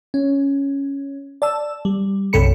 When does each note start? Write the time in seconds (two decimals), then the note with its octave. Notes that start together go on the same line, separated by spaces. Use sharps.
0.14 C#4
1.42 D5 A5 E6
1.85 G3
2.33 B1 F#2 C3 A4 B5 C#7